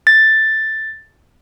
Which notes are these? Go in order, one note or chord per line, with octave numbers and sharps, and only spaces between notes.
A6